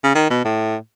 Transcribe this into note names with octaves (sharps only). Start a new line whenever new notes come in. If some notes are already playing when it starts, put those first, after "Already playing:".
C#3
D#3
B2
A2